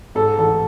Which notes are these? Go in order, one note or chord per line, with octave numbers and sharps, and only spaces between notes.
G#2 A4
A1 A4